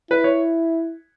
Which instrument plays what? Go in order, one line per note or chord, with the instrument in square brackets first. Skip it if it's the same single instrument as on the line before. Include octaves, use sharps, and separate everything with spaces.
[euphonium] E4 [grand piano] B4
[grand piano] C#5